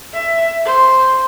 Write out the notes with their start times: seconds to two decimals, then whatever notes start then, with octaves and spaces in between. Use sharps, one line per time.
0.14 E5
0.66 C5